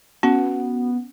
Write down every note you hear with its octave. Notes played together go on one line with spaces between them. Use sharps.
B3 C#4 F#4